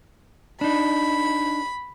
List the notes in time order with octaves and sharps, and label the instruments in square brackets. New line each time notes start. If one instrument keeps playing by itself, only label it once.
[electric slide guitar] D4 D#4 [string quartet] B5